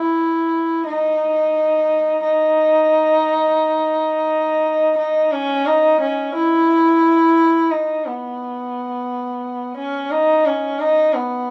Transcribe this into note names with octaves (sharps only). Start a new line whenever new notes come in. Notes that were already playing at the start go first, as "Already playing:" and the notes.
Already playing: E4
D#4
D#4
D#4
C#4
D#4
C#4
E4
D#4
B3
C#4
D#4
C#4
D#4
B3